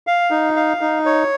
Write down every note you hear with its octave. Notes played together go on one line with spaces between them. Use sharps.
F5
D#4
F5
D#4
C#5